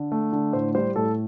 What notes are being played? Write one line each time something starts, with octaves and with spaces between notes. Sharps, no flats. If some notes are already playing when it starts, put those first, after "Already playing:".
Already playing: D3
A3
D3
A2 C5
G3 C5
A2 A4